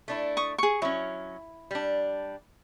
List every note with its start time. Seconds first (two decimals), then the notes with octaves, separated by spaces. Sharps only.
0.08 A3 D4 E4
0.37 C#6 D#6
0.58 G#4 C#6
0.82 F#3 C#4 E4
1.71 G3 D4